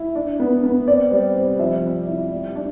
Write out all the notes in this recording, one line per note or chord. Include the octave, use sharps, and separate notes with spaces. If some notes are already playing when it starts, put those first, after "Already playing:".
Already playing: E4
D4
B3
B3
C4 D5
G3 C5
C3 C5
F3 E5
C3
E4
G3
D4